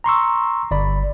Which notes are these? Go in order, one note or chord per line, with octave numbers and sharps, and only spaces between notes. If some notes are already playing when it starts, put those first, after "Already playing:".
A#5 C6 C#6 E6
G1 D5 B5